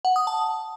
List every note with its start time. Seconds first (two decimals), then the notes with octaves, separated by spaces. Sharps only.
0.05 F#5
0.16 D#6
0.27 A5